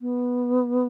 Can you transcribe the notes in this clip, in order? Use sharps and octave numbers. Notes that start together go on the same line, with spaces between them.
B3